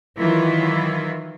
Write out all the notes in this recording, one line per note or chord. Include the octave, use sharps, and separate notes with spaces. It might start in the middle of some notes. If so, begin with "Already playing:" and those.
D#3 E3 F#3 E4 F4